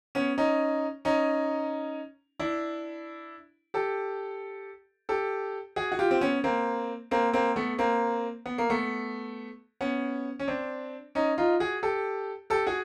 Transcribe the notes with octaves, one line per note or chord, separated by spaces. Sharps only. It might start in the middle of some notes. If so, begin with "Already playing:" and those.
B3 C#4
C#4 D#4
C#4 D#4
D4 E4
G4 A4
G4 A4
F#4 G#4
F#4
F4 G4
C4
B3 C#4
A#3 C4
A#3 C4
A#3 C4
A3 B3
A#3 C4
B3
A#3
A3 B3
B3 C#4
C#4
C4 D4
C#4 D#4
D#4 F4
F#4 G#4
G4 A4
G4 A4
F#4 G#4